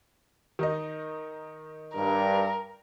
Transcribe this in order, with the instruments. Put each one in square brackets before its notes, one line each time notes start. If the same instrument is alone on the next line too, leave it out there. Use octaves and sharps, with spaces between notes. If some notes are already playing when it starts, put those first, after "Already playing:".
[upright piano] D#3 D#4 D#5
[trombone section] G2 [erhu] A#4